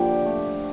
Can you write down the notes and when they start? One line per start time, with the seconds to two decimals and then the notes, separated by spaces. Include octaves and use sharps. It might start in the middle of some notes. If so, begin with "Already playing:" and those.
Already playing: D3 F3 A#3 G4
0.25 A3